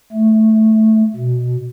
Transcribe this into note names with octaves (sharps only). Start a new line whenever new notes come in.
A3
B2